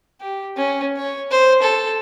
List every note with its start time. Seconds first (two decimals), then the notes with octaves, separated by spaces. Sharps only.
0.21 G4
0.57 C#4
0.97 C#5
1.31 C5
1.62 A4